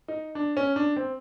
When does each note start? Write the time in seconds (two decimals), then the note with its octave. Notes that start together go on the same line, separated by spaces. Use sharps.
0.08 D#4
0.35 D4
0.57 C#4
0.76 D4
0.96 C4